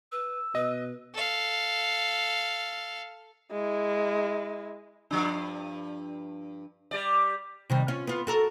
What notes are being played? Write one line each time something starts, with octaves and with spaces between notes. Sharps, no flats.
B4 E6
B2 B4 D#5
A4 F5
G#3 E4
G2 F3 D4
G3 D5
C3 D#3 G3
C#4 F4
B3 F4
F#4 A4 A#4